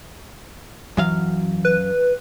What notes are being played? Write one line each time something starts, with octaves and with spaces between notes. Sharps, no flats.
F#2 E3 F#3 F5
B4